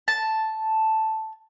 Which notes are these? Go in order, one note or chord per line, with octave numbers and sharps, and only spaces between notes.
A5